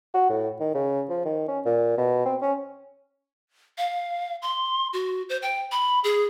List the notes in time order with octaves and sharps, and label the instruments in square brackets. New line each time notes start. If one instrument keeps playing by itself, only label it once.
[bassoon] F#4
A2
D#3
C#3
F3
D#3
C#4
A#2
B2
C4
C#4
[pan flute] F5
C6
F#4
C5
G5
B5
G#4